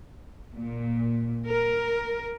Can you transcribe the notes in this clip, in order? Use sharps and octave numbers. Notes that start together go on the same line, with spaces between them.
A#2
A#4